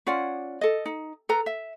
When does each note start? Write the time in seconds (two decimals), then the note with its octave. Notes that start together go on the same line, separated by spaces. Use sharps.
0.07 C#4 F4 D5 F#5
0.61 A4 D#5
0.86 D#4
1.29 A4 B4 A#5
1.46 E5